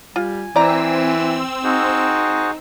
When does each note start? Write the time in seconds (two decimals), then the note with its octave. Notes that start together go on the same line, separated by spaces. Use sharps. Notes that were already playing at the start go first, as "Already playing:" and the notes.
0.16 G3 F4 G#5
0.56 E3 C4 D5 A#5 E6
1.64 D#4 F#4 G#4 C5